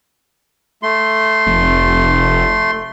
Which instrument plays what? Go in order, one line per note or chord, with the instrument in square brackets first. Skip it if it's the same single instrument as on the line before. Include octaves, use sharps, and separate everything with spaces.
[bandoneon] A3 C6
[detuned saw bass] F1